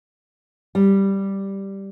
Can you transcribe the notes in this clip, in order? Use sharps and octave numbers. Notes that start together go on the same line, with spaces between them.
G3